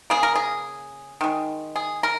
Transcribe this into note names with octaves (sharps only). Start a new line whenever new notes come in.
C#3 A#3 G#4
A#4
G#4
D#3 G#3
G#4
A#4